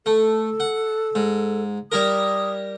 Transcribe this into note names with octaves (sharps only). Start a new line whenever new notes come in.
A3 A4
F#5
G#2
G3 E4 A#4 D#6